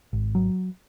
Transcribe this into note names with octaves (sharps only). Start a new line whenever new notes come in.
G#1
F#3